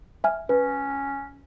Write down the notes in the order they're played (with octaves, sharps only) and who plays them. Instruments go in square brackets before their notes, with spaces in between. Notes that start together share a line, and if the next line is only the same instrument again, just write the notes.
[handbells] E5 G#5 F6
[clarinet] C#4 [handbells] B4